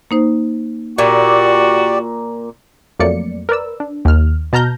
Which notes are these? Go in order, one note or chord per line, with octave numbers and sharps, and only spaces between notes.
A#3 D#4 C5
A#2 F#4 G4 D5
F2 F#3 A3 A#3 D5 C#7
A#4 B4 D5 E6
D4
D#2 F6
B2 A5 A#5 F6 G6 A#6